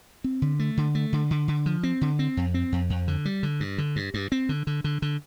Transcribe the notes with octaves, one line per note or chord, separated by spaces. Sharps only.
C4
D3
A3
D3
A3
D3
D3
D3
F3
C4
D3
C4
F2
C4
F2
F2
D3
G3
D3
G2
D3
G2
G2
C4
D3
D3
D3
D3